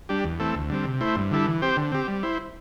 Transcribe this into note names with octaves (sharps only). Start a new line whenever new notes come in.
G3 D4 G4
E2
E3 A3 C4 A4
D2
D3 G3 C4
C3
A3 E4 C5
G2
D3 G3 E4 A4
E3
C4 G4 C5
D3
C4 G4
G3
E4 C5